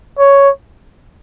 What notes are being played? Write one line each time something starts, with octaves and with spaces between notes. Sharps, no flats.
C#5